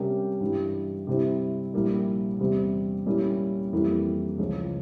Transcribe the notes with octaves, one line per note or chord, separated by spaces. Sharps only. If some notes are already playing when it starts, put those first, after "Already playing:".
Already playing: C3 G3 C#4 G4 A#4
G2 E3 G3
C3 G3 C4 E4
A#1 A#2 G3 A#3 E4
E2 C3 G3 C4
A#2 G3 A#3 C#4 E4
F2 E3 G3 A#3
C#2 C#3 F3